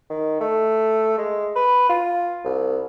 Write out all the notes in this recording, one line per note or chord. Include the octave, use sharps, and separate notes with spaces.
D#3
A3
G#3
B4
F4
C2